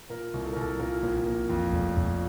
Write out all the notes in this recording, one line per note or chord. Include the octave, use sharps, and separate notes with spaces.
A#2 A#4
C2
A4
A#4
C2 A4
A#2 A#4
A#1 A#4
A#1 A#4
F2
F1
F1